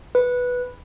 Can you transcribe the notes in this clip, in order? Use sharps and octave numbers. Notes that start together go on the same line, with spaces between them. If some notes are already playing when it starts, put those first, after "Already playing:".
B4